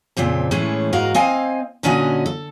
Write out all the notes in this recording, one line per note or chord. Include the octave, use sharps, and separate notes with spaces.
F2 A#2 C#3 C4
A2 E3 G#3 A3 C#4
G#2 F#4 A#4 D#5 F5
C4 D#5 F5 G#5
A#2 D3 C#4 F#4 D#5 G#5
A4